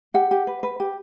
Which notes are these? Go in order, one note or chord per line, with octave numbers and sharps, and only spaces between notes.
G4 F#5
G4
B4
B4
G4